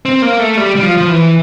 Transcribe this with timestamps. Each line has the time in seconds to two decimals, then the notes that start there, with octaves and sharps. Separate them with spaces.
0.05 C4
0.22 A#3
0.39 A3
0.57 G3
0.76 G3
0.83 F3
0.97 F3
1.09 E3